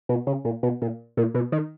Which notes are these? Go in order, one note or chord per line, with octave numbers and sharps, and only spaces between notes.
B2
C#3
A#2
B2
A#2
A#2
B2
D#3